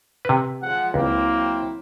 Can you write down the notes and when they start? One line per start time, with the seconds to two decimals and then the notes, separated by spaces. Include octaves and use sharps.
0.25 C3 B4
0.62 F3 G#3 F#5
0.94 C#2 F#3 A#3 C4 E4